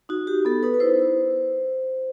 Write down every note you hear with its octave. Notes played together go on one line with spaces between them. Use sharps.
D#4 F#4
D#4 G4
B3 A4
D#4 B4
B4
E4 C5
E4